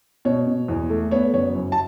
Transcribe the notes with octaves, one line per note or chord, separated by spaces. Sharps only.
B2 C#5
B2
E2
A3
B3 C#5
F#1 C#5
F#2
A5